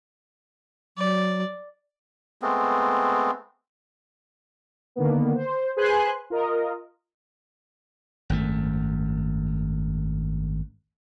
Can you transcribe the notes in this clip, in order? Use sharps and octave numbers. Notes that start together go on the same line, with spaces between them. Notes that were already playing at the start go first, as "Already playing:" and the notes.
F#3 D5
G#3 A3 B3 C4
D3 D#3 A#3 B3
C5
G#4 B4 C5 G#5 C6 F#6
F4 A#4 D#5
G#1 F#2 A3